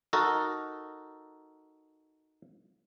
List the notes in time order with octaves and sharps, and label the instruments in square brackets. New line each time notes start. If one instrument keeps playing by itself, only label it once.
[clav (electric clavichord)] D#4 F#4 A4 A#4